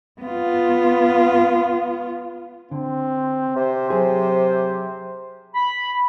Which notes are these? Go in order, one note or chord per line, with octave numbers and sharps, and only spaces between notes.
B3 F4
D3 C4
C3 C5
F#3 G#4 C5
B5